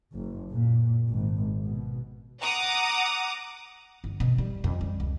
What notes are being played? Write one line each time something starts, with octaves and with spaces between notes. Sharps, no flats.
F#1
A#2
G#1
B2
F#5 A#5 D6 D#6
G1
B2
G3
F2
G3
C#2